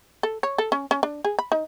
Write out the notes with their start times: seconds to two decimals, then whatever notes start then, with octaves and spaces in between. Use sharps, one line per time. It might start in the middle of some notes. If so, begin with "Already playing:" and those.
0.23 A4
0.43 C#5
0.58 A4
0.72 C#4
0.91 C#4
1.03 D4
1.25 G#4
1.39 B5
1.52 D#4